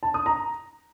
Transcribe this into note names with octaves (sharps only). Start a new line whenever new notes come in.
A5
D#6
A#5